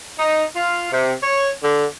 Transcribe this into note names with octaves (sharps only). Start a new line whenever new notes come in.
D#4
F4
C3
C#5
D3